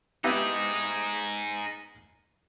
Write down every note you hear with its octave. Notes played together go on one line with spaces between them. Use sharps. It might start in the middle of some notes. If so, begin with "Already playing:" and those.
B3 D#4 E4 G4 G#4